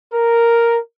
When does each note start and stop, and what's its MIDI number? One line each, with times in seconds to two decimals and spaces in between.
0.13 0.76 70